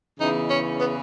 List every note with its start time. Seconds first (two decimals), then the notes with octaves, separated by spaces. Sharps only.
0.20 E2 C#3 E3 D#4
0.50 C#4
0.80 B3